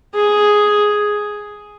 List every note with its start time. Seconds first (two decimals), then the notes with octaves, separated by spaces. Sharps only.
0.14 G#4